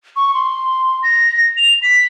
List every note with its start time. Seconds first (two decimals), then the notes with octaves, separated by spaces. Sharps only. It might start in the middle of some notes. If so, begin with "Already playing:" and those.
0.16 C#6
0.34 C6
1.03 A#6
1.57 F7
1.83 B6